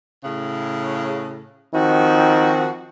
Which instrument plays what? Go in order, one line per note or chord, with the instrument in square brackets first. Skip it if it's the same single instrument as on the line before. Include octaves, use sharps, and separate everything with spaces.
[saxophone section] A2 C#3
[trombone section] D#3 C4 D#4 [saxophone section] F3 F#4